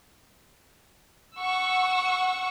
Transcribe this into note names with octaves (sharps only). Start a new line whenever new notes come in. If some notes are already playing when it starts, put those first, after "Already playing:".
F#5 C#6 E6